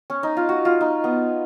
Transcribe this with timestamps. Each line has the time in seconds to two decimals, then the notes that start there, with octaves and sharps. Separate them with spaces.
0.10 C#4
0.23 D#4
0.37 F4
0.49 F#4
0.65 F4
0.81 D#4
1.04 B3